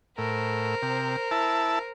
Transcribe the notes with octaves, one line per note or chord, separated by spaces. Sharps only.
A2 A#4 C5
C3
E4 A5